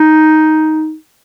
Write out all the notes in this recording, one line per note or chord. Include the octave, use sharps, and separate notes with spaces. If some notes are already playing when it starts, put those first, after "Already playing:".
Already playing: D#4